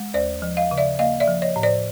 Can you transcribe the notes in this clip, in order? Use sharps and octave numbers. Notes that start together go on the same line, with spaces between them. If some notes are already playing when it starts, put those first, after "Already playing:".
Already playing: G#3
D#2 C5 D5
F3
D#5 F5
C#3
D5 E5
A#3 D#5 F5
D5 E5
F3
C#5 D#5
A2
C5 D5